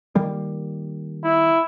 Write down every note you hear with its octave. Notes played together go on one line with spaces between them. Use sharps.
D#3 G3 A#3
E4